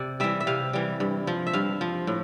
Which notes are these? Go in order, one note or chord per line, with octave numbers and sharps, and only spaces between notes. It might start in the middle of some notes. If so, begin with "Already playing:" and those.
Already playing: C3 D5
E3 G3 E5
E5
C3 F5
E3 G3
G2
F3
E5
G2 F5
F3
A2